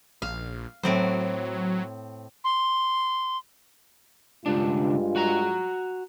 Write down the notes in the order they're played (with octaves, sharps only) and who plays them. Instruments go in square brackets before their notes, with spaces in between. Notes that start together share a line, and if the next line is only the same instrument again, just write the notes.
[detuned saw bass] A#1 [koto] F5
[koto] A2 C4 C5 [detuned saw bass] F#3
[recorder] C6
[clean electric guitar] C#2 D4 [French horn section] G2 G#3 F4
[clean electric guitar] F#4 A#5